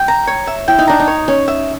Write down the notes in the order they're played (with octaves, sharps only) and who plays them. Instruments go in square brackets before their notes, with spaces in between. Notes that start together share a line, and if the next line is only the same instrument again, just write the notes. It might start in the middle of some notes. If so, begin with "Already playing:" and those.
Already playing: [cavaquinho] G5
A#5
C#5
E5
[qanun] E4 [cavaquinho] G5
[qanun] D#4
[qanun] D4 [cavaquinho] A#5
[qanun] D#4
[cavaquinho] C#5
[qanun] C#4 [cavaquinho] C#5
[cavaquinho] E5